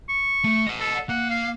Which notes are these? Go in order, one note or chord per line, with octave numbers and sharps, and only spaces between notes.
C#6
A3
D#5 F#5
A4
A#3 F#5
F5